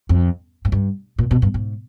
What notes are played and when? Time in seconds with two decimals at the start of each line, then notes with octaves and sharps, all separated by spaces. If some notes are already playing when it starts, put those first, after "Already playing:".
0.09 F2
0.65 G#2
0.72 G2
1.19 A#2
1.31 B2
1.42 G2
1.54 G#2